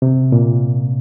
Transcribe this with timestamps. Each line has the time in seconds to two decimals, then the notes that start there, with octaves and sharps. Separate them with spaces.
0.02 C3
0.32 A#2